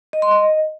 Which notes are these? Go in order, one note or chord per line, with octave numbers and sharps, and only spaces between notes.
D#5
C6
D#5